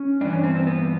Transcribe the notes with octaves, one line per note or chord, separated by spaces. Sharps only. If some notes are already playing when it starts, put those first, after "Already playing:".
Already playing: C#4
G2 E3 D4
C#4
C4
C4
B3